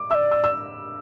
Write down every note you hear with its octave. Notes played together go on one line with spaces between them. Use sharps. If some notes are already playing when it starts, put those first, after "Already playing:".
Already playing: D6
D5 E5 E6
E6
E6